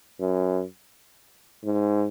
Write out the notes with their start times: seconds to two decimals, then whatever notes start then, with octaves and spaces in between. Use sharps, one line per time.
0.20 F#2
1.64 G#2